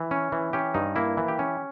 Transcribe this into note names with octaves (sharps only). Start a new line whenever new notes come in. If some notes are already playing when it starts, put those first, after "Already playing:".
Already playing: E3
C#4
E3
C#4 G4
G2 D#4
A#3 E4
E3
G4
C#4